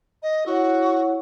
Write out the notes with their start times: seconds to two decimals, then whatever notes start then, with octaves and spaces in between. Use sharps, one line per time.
0.23 D#5
0.46 E4 F#4 C#5 F#5